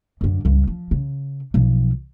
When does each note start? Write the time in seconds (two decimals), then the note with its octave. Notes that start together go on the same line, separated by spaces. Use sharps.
0.21 F#2 D3
0.45 C#2 G2
0.67 F3
0.91 C#3
1.54 B1 F3